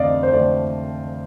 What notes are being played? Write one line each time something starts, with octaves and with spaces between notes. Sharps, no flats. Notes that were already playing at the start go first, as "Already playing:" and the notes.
Already playing: F2 D3 A3 C4 D5 D#5 F5
C5
F2 D3 A3 C4 D5